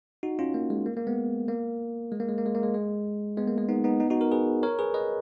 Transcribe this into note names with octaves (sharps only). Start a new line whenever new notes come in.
D#4 F#4
C#4 F4
A#3
G#3
A#3
A#3
G#3 B3
A#3
G#3
A#3
G#3
A#3
G#3
A#3
G#3
G#3
G#3 B3
A#3
G#3
B3 D#4
B3 D#4
B3 D#4
D#4 F#4
F#4 A#4
G#4 B4
A#4 C#5
G#4 B4
B4 D#5